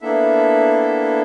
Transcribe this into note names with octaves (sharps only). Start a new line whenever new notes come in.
A#3 B3 D4 E4 A4 E5